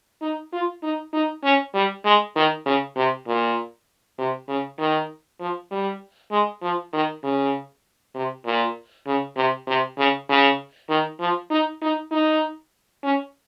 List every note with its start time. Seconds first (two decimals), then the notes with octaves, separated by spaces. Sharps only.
0.22 D#4
0.53 F4
0.83 D#4
1.13 D#4
1.44 C#4
1.74 G3
2.05 G#3
2.36 D#3
2.66 C#3
2.96 C3
3.27 A#2
4.18 C3
4.49 C#3
4.79 D#3
5.40 F3
5.71 G3
6.32 G#3
6.62 F3
6.93 D#3
7.24 C#3
8.15 C3
8.45 A#2
9.07 C#3
9.37 C3
9.68 C3
9.98 C#3
10.29 C#3
10.89 D#3
11.20 F3
11.51 D#4
11.82 D#4
12.12 D#4
13.04 C#4